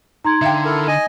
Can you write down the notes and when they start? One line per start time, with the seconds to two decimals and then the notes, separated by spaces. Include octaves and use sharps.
0.24 D#4 A#5 C6 G#6
0.42 D3 E5 F5 G5
0.65 E4 A4 A#4
0.88 D#5 G#5 D#7